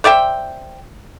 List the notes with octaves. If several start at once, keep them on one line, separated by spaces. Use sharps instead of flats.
C5 D5 E5 G5